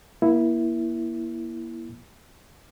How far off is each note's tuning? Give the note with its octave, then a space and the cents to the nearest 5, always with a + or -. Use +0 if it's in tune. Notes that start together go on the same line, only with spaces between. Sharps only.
A#3 +30 E4 +0